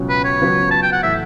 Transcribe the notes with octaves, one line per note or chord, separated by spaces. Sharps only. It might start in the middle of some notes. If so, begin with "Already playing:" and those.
Already playing: C#2 B2 F#3 C#4
B4
C#5
C#2 C#3 F#3 B3
A5
G5
F#5
A2 E3 A3 E5